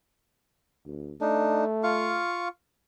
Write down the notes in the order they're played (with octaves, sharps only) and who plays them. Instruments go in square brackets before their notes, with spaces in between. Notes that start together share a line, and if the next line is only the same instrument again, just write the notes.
[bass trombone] D2
[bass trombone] A3 [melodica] D4 D#4
[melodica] F4 F5 C#6